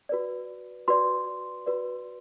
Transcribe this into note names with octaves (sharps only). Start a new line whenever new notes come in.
F#4 B4 D5
F#4 B4 D5 C6
F#4 B4 D5